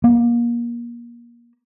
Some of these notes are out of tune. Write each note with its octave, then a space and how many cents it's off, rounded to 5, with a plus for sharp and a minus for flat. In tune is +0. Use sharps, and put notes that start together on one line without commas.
A#3 +30